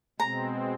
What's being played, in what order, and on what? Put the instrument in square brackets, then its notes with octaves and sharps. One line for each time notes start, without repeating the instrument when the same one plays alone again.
[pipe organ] B2 G#3 C4 [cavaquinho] A#5